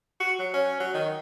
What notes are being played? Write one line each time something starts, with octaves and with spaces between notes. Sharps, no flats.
F#4
F#3
C#4
F#3
D#3